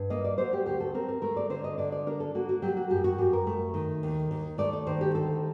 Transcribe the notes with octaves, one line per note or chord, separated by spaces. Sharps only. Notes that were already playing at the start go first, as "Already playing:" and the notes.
Already playing: G2
A#3 D#5
D5
F#3 C5
G4
D2 G4
A4
C4 A#4
A#4
A3 A#4
D5
D3 C5
D#5
D3 D5
D5
D4 A#4
A4
A#3 F#4
F#4
F#3 G4
F#4
F#2 G4
F#4
F#2 G4
A#4
A3
D#3
D#2
D#2
A3 D5
D5
D#3 C5
G4
D2 A4